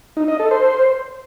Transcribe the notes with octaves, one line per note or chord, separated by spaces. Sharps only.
D#4
D#5
A4
C5